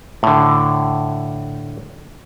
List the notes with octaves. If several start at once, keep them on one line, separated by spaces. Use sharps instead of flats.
A2 D3